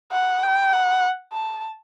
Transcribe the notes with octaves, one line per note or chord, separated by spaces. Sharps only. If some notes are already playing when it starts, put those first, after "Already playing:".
F#5
G5
F#5
A5